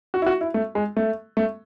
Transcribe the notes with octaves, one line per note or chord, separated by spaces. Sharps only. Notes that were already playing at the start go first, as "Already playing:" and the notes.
F#4
E4
F#4
E4
A3
G#3
A3
A3